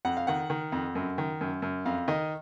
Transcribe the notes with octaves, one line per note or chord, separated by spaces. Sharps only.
F2 F#5
F5
D#3 F#5
D#3
F2
F#2
D#3
F#2
F#2
F2 F5
D#3 D#5